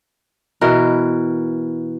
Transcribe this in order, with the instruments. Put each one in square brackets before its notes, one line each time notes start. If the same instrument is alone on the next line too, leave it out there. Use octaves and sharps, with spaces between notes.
[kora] B2 E3 A#4